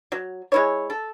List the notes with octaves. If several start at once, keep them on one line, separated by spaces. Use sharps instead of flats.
F#3
G#3 E4 C#5
A4